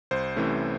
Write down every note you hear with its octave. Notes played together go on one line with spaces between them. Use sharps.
C2 C5
C3 E3 A3 C#4